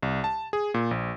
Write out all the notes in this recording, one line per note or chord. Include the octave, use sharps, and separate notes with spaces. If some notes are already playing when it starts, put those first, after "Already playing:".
C2
A5
G#4
A#2
A#1